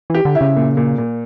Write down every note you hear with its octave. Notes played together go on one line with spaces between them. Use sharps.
E3 G4
D3
E4
C#3
A#2
A#2
A#2